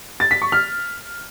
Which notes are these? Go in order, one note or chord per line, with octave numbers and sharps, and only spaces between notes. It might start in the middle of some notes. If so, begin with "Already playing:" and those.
A6
B6
C#6
F6